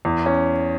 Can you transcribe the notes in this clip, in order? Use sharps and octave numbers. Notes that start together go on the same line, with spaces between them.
E2
C#4